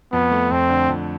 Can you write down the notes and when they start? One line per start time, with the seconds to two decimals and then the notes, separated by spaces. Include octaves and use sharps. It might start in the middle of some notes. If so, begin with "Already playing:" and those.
0.12 F2 B3
0.31 A3
0.51 F2 C4
0.70 D3
0.89 F2